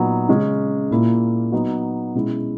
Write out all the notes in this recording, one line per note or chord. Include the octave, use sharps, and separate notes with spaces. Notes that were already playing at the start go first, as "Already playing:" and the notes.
Already playing: A#2 F#3 B3 D#4
C#3 G#3 C#4
A#2 A#3 E4
F#3 B3 D#4
B2 G#3 C#4 E4